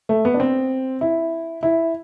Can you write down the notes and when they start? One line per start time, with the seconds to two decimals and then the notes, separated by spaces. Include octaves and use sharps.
0.09 A3
0.25 B3
0.34 D4
0.40 C4
1.01 E4
1.63 E4